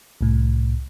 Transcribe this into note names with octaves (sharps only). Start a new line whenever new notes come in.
C2 A2